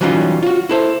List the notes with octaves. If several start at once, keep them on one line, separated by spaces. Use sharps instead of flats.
E3 F#3 G3 C#4 D#4 F4
F4 F#4
E4 A4 C5